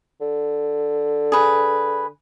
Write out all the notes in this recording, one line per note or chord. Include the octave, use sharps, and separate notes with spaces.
D3
G#4 B4